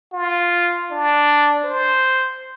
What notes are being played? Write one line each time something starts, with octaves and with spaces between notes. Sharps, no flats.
F4
D4
C5